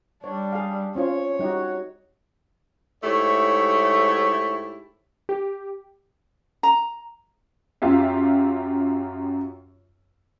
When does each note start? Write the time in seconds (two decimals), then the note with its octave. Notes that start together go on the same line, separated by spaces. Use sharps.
0.24 G3 D4 C#5
0.52 G#4 F5
0.95 C4 C#4 F4 C#5
1.39 G3 D#4 F#4 G4
3.04 G#2 A3 E4 G4 C#5
5.29 G4
6.63 A#5
7.82 F#2 F4 G4 E5